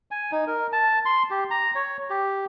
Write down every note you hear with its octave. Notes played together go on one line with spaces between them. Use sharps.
G#5
D#4
A#4
A5
C6
G4
A#5
C#5
G4